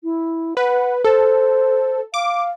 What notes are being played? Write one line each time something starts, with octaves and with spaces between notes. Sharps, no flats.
E4
B4 F#5
A4 C5
F5 D6